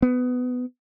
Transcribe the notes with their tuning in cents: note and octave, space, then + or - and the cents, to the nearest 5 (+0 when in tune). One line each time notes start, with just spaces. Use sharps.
B3 +20